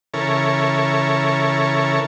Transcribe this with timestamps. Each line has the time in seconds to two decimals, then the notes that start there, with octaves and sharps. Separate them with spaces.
0.14 C#3 E3 A4 A#4 C#5